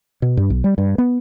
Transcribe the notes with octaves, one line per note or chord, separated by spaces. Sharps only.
B2
G2
B1
G3
G2
B3